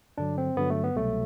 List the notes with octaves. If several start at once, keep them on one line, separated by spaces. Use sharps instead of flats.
G2 D3 F#3 D4
C4
G2 D3 F#3 B3
A3
B3
C2 B2 F#3 A3